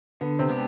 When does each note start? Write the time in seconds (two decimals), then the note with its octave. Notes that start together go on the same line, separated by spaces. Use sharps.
0.21 D3 B3
0.39 C3 C4
0.49 G#3 B3 D4 G4